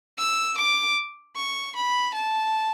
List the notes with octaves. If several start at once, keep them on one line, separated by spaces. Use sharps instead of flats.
E6
D6
C#6
B5
A5